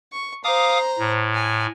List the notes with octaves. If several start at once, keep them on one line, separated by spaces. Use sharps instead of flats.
C#6
C5 F5 A#5 D6 D#6
A2
G#5